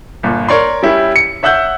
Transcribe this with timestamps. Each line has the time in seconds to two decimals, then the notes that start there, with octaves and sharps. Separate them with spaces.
0.23 G1 A#2
0.48 A#4 C#5 D5 C6
0.83 G3 C#4 E4 G4
1.16 C#7
1.43 C#5 E5 F#5 E6 F#6 G6